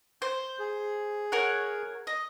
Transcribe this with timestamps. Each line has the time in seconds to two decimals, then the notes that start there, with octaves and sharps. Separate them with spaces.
0.22 C5 G6
0.59 G#4
1.32 A#4 C#5 F#5
2.07 D#5